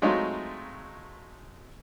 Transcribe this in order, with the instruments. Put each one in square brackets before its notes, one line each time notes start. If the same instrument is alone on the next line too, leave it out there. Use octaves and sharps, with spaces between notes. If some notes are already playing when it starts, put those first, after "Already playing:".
[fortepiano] F#3 G#3 A3 C4 D#4 F4